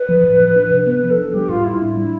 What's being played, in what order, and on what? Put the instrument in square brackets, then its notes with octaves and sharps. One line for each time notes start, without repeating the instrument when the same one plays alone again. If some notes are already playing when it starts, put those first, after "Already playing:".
Already playing: [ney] B4
[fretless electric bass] F3
A2
F3
D4
C3
[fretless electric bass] B3 [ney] B4
[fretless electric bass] F3
[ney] A4
[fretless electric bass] D4
[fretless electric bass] G3 [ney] G4
[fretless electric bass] A2 [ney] F4
[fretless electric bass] A2 [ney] E4
[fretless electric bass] D4
G3